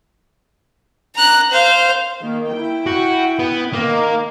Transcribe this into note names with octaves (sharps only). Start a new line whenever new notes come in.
A#5 F#6
C5 F5
D#3 A#3
E4 G5
F#4
B3
D#3 A#3